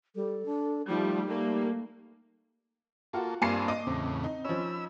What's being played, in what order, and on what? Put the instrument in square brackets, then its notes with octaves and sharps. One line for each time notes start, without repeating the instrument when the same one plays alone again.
[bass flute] G3 [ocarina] A4
[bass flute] D4
[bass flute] F3 [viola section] G3 A3 [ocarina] D#4
[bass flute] G3 [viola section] A3 A#3
[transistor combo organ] A#3 A4 [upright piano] F4 F#4 F#5
[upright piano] G2 [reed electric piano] A#3 [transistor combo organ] C4 D4 F4 [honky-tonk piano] G#5 A5 C7
[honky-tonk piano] D#5 D6 [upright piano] D#7
[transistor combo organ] E2 A2 C#3 [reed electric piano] C4
[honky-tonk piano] D#4
[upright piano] F3 C#4 [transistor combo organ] B5 E6